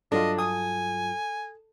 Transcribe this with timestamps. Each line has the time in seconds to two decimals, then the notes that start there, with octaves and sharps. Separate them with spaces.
0.12 G2 F#3 D4 F4 A4 D#5
0.39 G#5 D#6